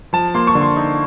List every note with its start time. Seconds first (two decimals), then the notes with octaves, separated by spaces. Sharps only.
0.13 F3 A5
0.34 A#3 C6
0.47 C#6
0.55 D3
0.61 C6
0.77 D#4